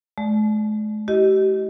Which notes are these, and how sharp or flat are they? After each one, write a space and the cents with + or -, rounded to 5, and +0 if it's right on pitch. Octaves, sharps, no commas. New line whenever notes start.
G#3 +45 D5 +0
E4 +0 G4 -35 D#5 +0